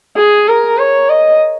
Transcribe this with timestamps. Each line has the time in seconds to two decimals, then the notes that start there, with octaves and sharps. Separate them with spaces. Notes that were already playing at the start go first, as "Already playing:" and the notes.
0.17 G#4
0.48 A#4
0.78 C#5
1.09 D#5